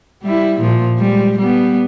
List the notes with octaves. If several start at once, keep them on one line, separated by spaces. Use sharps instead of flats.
G3 E4
A#2 F3
G3 G#3
G3 B3